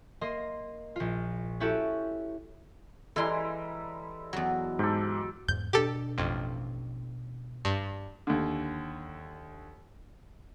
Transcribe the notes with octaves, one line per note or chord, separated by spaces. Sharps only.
A#3 D#5 C6
A#1 F4
C#4 E4 F#4 G4 A4
E3 G3 G#3 E4 A4 A#5 C6
E2 F#3
G#2 G4 A4
E2 G#2 G6
B2 D4 G4 A4
A1 F2
G2
D#2 D3